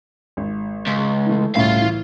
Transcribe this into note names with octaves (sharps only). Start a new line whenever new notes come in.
G#1
C#2
E3 A3
C2 A2 C#3 F4 F5
E3